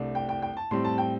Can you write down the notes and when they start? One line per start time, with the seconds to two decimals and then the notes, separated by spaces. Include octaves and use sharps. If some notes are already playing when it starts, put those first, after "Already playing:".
Already playing: C2 C3 A3 D4
0.15 G5
0.29 G5
0.42 G5
0.57 A5
0.71 A2 G3 C4 C6
0.84 A5
0.98 G5